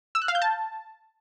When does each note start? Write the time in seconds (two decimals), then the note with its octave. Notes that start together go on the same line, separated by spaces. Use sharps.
0.15 E6
0.22 F#6
0.28 F5
0.35 G6
0.42 A5